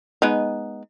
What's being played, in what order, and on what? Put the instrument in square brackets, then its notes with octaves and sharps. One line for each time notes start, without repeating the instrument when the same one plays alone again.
[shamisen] G#3 B3 D#4